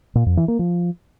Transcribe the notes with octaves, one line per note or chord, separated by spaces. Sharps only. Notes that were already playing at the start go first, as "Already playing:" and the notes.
A#2
F2
E3
A#3
F3